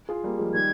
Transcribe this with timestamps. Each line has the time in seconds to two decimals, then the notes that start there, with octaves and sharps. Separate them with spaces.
0.09 F4 G#4
0.24 G3 A#3
0.39 F3 G#3
0.54 D#3 G3 G#6